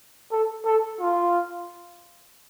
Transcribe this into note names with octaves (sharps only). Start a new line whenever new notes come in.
A4
A4
F4